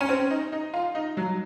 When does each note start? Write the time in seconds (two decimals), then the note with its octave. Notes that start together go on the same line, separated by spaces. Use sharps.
0.01 C#4
0.09 C4
0.31 D#4
0.52 D#4
0.74 F4
0.95 D#4
1.17 F#3